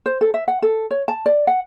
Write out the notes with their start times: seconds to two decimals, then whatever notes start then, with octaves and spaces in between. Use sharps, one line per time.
0.06 C5
0.21 A4
0.34 E5
0.48 F#5
0.62 A4
0.91 C#5
1.08 A5
1.26 D5
1.47 F#5